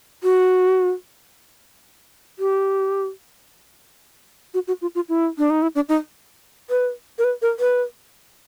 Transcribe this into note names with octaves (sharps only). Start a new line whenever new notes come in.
F#4
G4
F#4
F#4
F4
F4
E4
D4
D#4
E4
D4
D#4
B4
A#4
B4
A#4
B4